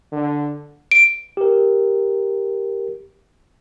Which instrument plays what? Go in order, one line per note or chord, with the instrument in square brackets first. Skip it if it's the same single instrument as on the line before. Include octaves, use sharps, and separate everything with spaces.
[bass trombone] D3
[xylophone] D7
[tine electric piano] G4 A#4